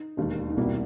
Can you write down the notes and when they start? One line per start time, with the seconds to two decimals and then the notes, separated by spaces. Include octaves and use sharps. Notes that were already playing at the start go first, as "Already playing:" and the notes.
Already playing: D#4
0.17 E1 D#2 D#3
0.50 D#4
0.57 C2 B2 G3 A#3 E4